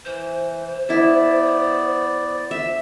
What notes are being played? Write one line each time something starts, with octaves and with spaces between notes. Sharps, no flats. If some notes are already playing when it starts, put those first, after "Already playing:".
E3 C5
B3 E4 D5 E5
E5